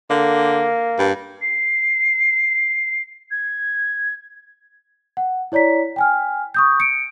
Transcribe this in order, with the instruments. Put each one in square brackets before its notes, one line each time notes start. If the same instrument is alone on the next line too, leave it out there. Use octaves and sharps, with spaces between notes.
[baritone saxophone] D3 [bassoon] A#3
[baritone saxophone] G2
[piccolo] C7
G#6
[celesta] F#5
E4 C#5 D5 A#5 B6
G5 G#5 F6
C#6 D#6 G6
C#7 D7